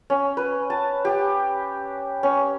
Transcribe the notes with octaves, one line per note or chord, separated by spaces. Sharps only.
C#4
B4
A5
G4
C#4